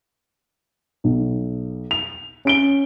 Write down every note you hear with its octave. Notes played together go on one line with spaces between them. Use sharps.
B1
F7
C#4 D7 G7